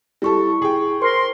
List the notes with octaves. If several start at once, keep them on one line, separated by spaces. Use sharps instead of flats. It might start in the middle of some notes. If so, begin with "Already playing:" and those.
G3 E4 A4 C#6
G#4 G5
A#4 C5 C6